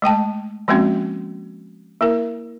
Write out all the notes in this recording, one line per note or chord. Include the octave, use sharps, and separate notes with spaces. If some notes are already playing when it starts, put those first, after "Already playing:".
G#3 A3 G5 A5
F3 G#3 A#3 C4 C#4 F#4
A#3 E4 A#4